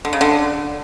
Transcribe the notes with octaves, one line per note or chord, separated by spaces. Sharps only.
D3
C#3
D3